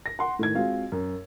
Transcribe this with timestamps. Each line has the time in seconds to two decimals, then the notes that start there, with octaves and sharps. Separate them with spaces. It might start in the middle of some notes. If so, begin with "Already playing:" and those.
0.06 A#6
0.19 F#5 C6
0.39 A2 D#3 G#6
0.55 G#3 C4 F4 F#4 F5
0.92 F#2